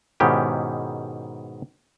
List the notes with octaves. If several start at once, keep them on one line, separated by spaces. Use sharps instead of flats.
G#2 B2 D#3 C#4 E4 G4